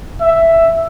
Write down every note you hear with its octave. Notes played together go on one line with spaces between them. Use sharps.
E5